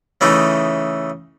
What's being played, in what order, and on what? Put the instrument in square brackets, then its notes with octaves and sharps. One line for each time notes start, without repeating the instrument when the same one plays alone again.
[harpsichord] C#3 E3 A3 D#4